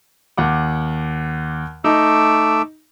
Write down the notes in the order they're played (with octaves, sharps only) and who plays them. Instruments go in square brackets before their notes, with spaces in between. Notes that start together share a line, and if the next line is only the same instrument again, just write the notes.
[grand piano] D#2 F#5 D6
[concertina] A3 D6 E6 [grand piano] D#4